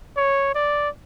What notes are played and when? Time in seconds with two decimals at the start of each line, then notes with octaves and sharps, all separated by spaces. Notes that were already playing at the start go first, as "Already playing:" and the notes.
0.17 C#5
0.55 D5